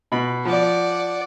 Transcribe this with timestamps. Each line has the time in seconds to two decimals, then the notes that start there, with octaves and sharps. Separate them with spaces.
0.12 B2 B5
0.45 F3 D5 F#5